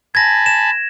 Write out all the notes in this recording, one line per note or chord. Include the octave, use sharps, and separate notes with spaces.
G#5 A5 B5 G#6 A#6
E7